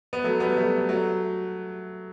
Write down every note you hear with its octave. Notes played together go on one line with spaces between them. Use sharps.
B3
F#3 A3
G3 B3
F#3 A3
F#3 A3